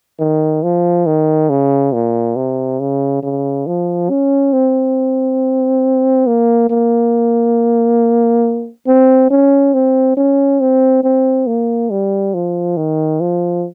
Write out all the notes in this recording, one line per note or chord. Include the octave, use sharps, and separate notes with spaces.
D#3
F3
D#3
C#3
A#2
C3
C#3
C#3
F3
C#4
C4
A#3
A#3
C4
C#4
C4
C#4
C4
C4
A#3
G3
F3
D#3
F3